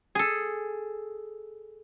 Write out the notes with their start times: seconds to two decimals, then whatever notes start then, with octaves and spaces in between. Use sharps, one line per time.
0.15 G#4 A4